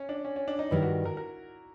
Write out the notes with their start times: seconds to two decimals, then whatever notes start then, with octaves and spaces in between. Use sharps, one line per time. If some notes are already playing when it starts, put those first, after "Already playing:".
Already playing: C#4
0.09 D4
0.25 C#4
0.36 C#4
0.48 D4
0.59 D#4
0.71 G2 D#3 G3 E4
0.82 F#4
1.05 A#4
1.17 A#4